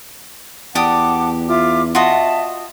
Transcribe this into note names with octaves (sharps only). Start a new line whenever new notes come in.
E2 G4 D5 F#5 A5 D6 D#6
F4 E5 D6
F4 F#4 D#5 E5 A5